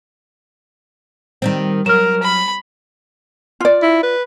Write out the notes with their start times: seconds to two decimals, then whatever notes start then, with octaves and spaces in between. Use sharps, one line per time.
1.42 D#3 G3 C4
1.86 F#3 A#4 F6 E7
2.23 B5
3.60 F4 D5
3.82 E4
4.03 B4